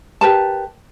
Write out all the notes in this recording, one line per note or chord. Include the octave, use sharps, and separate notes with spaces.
G4 A#4 B4 A5